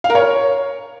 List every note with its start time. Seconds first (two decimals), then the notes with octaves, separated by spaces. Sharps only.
0.04 F5
0.10 A#4
0.15 C#5